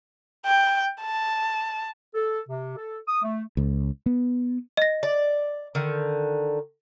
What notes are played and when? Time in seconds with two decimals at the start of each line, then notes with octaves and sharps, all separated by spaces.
0.46 G5
1.02 A5
2.15 A4
2.48 C3
2.76 A4
3.08 D#6
3.22 A3
3.57 C#2
4.06 B3
4.77 D#5 A#6
5.03 D5
5.75 D3 D#3